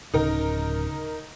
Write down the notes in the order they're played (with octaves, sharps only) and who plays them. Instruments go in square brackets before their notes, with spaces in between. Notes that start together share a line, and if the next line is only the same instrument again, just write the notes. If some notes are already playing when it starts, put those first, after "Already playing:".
[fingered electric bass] D1 C#3 [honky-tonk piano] D#4 A#4